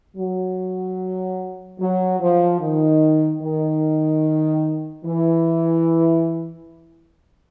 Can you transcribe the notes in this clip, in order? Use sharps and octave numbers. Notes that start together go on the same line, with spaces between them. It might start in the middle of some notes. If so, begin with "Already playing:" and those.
F#3
F#3
F3
D#3
D#3
E3